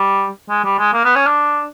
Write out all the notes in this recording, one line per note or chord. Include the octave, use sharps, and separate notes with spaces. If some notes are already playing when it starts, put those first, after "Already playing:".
Already playing: G3
G#3
G3
G#3
A#3
B3
C#4
D4